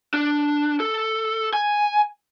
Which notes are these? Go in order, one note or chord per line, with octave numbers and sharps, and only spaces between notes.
D4
A4
G#5